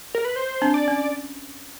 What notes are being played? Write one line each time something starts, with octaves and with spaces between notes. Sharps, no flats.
A#4
B4
C5
C4 D4
D5
C#4